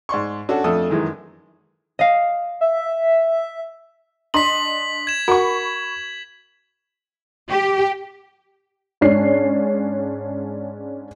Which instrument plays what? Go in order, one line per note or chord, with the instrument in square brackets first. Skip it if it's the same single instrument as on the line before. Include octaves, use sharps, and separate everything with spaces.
[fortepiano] G#2 D5 C6 C#6
C#4 D4 F#4 A4
F2 A3 D4 A4 D#6
F#2 D#3 E3 G#3
[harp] D#5 F5
[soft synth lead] E5
[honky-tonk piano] D4 D#5 C6 [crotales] B6 F#7
[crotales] G#6 E7
[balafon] F#4 A#4 F#5 [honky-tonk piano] B5 C#6
[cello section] G4
[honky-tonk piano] G#2 C#4 D4 C7